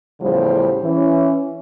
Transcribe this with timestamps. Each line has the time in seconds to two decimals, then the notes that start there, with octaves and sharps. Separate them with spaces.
0.21 E2 A2 C#3 F3 G3 C5
0.82 E3 C#4